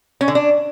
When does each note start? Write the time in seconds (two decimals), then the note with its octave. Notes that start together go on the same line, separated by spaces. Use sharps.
0.21 C#4
0.28 D3
0.35 D4